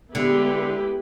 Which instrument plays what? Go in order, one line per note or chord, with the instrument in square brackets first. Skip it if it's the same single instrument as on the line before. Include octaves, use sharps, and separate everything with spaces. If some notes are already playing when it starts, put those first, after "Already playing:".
[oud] D3 [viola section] G#3 B3 E4 G4 B4